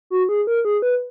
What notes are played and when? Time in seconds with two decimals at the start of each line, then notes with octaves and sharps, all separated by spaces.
0.10 F#4
0.29 G#4
0.47 A#4
0.65 G#4
0.82 B4